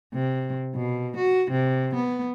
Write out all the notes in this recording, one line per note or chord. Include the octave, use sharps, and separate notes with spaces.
C3
B2
F#4
C3
B3